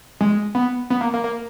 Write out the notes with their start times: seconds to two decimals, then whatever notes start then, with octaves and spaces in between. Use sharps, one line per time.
0.21 G#3
0.55 B3
0.90 B3
1.01 A#3
1.14 A#3
1.24 A#3